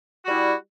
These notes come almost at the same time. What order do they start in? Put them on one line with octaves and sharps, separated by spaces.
F#4 G3 E4